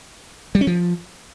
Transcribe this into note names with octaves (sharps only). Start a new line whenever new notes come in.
G3
C#4
F3